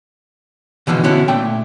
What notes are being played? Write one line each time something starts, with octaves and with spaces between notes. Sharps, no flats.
B2 D3 E3 F3 G#3
D3 B3 C#4 E4 F#4
A#2 A3 G5